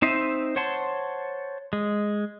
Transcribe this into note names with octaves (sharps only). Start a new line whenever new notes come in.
C4 D#4 C5 D#5 E5
C5 C#5 F#5 A5 C6
G#3